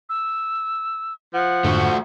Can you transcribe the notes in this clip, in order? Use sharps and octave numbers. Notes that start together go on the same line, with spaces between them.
E6
F3 F#5
F2 G#2 D3 A3 F#4